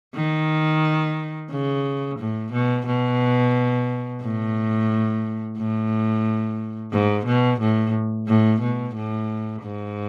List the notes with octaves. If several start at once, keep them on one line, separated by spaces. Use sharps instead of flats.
D#3
C#3
A2
B2
B2
A2
A2
G#2
B2
A2
A2
B2
A2
G#2